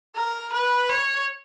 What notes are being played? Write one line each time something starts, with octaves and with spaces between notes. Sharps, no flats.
A#4
B4
C#5